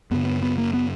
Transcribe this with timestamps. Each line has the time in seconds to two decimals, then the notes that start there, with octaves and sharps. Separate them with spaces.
0.11 F#2 C#3 B3
0.26 B3
0.42 B3
0.58 A#3
0.74 B3